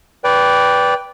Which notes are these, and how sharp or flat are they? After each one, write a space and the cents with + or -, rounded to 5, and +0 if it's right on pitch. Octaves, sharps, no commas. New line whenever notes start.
B4 +0 D5 -20 G5 +0